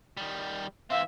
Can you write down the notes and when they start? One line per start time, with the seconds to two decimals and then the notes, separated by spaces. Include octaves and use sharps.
0.17 D#3 G3
0.90 E3 C4 E5 F5